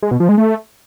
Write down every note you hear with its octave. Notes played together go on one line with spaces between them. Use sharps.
G#3
B2
F3
G#3
A3